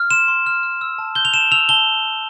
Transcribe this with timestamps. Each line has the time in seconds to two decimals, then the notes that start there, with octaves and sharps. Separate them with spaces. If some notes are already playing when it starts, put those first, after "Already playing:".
Already playing: F6
0.11 C6 E7
0.28 C6
0.46 F6
0.63 F6
0.81 E6
0.98 A5
1.15 G6 G7
1.25 F7
1.34 A5 E7
1.51 E6 F7
1.69 A5 G7